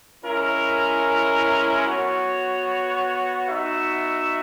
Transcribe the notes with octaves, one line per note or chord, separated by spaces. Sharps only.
G#3 C#4 E4 A#4
B3 F#4 C#5
B3 D#4 F#4 E5